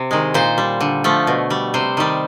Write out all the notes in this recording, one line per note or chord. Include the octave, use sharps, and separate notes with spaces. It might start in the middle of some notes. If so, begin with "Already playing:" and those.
Already playing: C3
D#3 G#3
A#2 C5
G3
D3
F3 A3
B2
G3
C3 C5
D#3 G3